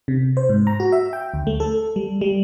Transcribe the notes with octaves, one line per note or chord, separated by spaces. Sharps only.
C3
C5
G#2
A#5
F#4
E5
G5
D2
A3
A4
G3
G3